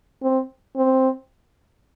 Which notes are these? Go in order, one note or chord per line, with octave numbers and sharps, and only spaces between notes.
C4
C4